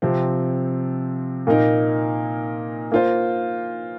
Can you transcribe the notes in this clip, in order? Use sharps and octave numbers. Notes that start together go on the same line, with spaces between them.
C3 F3 C4
A#2 A#3 D#4 A#4
A#3 F4 C5